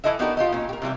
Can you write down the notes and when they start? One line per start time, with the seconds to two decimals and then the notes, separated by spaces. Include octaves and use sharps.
0.04 E3 A#3 E4 A4 D#5 E5
0.19 B3 D4 D#4 F#4 G4 A#4
0.37 F4 G4 D#5
0.52 A#2 C#4
0.69 G4 A#4
0.82 C3 E3 G3 E5